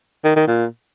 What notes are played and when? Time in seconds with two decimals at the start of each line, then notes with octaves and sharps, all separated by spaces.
0.24 D#3
0.36 D#3
0.47 A#2